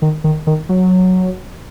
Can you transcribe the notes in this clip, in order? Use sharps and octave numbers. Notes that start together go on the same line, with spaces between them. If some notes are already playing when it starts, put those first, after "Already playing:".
D#3
D#3
D#3
F#3